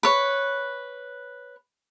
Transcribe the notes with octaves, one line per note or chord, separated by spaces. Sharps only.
B4 C#5